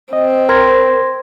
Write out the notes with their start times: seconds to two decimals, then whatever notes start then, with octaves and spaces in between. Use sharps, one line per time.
0.13 C4 D#5
0.49 A#4 C6 G#6 A#6